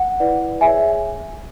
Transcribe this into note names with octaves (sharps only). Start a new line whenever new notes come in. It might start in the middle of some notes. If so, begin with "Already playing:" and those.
Already playing: F#5
E4 B4 D5
G#4 C#5 E5 G#5